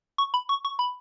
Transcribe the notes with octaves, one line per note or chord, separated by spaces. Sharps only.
C#6
B5
C#6
C#6
B5